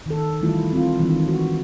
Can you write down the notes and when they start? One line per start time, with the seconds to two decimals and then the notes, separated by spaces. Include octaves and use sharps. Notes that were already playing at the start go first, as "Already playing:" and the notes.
0.06 D#3 A4
0.40 D#3 E3 G3 A3 E4 F4
0.73 C4 F4
0.99 D#3 E3 G#3 C4 D4
1.28 F#4